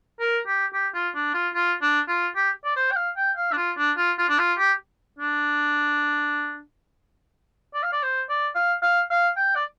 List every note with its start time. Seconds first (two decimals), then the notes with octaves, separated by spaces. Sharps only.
0.20 A#4
0.47 G4
0.74 G4
0.95 F4
1.15 D4
1.34 F4
1.54 F4
1.81 D4
2.08 F4
2.36 G4
2.65 D5
2.76 C5
2.91 G5
2.96 F5
3.17 G5
3.37 F5
3.52 D4
3.57 F4
3.78 D4
3.97 F4
4.18 F4
4.29 D4
4.39 F4
4.58 G4
5.19 D4
7.75 D5
7.83 F5
7.92 D5
8.03 C5
8.29 D5
8.55 F5
8.83 F5
9.11 F5
9.36 G5
9.56 D5